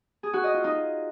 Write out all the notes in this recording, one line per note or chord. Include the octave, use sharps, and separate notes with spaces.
G#4
F#4
D#5
F4
D#4